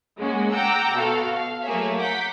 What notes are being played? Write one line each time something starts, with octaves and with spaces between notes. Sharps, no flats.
G#3 A#3 C#4 F#4
F#5 G5 A#5 D6 E6 G6
B2 F#4 A4 F5
F5
F#3 A3 A#3 G#4 C#5 E5
F#5 A#5 D6 G6 B6